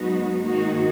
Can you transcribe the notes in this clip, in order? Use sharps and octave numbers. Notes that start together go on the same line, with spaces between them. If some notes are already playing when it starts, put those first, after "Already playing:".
Already playing: G#2 F#3 B3 D#4 F#4
G#2 D#3 A#3 D#4 F#4